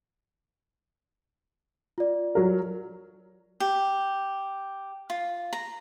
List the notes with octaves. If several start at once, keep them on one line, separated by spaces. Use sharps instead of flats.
F4 D5
F#3 A#4
G4
F4
A#5